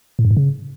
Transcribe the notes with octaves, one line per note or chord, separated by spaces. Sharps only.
A2
G2
G#2
C#3